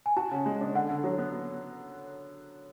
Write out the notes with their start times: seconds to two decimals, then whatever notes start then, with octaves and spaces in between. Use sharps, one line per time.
0.06 G#5
0.16 F#4 A5
0.31 C#3
0.46 G#3
0.61 D4
0.75 D3 F#5
0.90 D3
1.04 F#3
1.18 B3